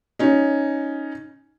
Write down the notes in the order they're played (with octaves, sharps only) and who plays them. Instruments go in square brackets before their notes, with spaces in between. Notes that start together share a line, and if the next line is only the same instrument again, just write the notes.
[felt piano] C#4 D#4